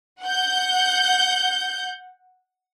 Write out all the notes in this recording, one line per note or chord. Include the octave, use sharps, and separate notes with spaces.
F#5 G6